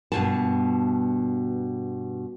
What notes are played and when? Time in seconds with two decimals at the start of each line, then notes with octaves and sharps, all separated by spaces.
0.12 G2 B2 A5